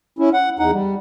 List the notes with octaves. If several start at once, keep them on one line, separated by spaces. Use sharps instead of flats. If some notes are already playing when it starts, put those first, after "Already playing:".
C#4 E4
F#5
E2 D#4 F#5
G3